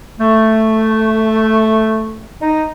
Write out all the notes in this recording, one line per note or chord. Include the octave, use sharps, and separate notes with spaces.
A3
D#4